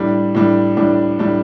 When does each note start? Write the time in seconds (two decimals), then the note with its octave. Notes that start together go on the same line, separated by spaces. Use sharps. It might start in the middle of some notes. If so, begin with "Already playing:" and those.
Already playing: A2 G3 D4
0.35 A2 G3 D4
0.77 A2 G3 D4
1.19 A2 G3 D4